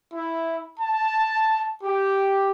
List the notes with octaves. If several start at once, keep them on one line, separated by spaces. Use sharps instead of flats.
E4
A5
G4